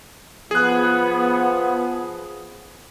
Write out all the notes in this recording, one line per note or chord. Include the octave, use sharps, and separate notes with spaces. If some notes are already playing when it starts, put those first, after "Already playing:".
F3 B3 G#4 F#6